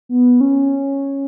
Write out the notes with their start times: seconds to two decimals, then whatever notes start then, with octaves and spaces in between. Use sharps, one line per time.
0.09 B3
0.41 C#4